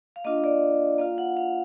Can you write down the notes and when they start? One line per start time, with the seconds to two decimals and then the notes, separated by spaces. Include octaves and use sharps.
0.16 F5
0.24 A#3 D4 F4 D#5
0.44 D5
0.99 A#3 F4 F5
1.18 F#5
1.37 F5